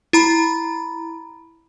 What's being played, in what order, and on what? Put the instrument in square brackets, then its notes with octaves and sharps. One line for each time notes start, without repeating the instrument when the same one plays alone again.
[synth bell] E4 A#5 B5